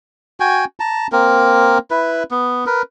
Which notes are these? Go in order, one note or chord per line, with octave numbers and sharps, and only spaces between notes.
F#4 G5 G#5
A5 A#5
A#3 C4 A#4
E4 B4
B3
A#4 B4